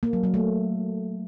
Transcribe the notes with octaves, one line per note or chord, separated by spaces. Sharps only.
A#3
F#3
F#3
A3